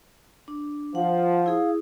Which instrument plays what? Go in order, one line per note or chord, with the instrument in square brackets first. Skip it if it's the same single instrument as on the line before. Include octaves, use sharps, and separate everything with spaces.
[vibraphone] D4
[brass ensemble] F3 [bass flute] F5 [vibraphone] F#5
[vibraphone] E4 G#4 D#6